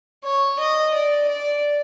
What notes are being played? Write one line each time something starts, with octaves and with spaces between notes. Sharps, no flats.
C#5
D#5
D5
D5